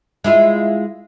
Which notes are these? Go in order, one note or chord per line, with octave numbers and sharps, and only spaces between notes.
G#3 E4 F4